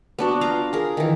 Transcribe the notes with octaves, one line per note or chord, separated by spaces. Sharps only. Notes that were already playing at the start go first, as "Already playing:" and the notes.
B3 D4 F#4
F4 F5 A#5
G#4 A#4
D#3 E3